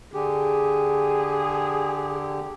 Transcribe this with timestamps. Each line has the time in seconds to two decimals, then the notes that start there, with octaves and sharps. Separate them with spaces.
0.13 D3 G4 G#4